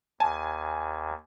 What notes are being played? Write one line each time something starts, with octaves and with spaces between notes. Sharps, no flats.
D#2 G#5 A5